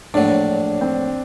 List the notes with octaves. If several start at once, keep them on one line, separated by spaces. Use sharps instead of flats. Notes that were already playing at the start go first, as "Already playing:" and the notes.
A#1 A2 F#3 D4
C4